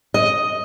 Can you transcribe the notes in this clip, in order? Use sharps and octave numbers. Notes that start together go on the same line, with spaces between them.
D#5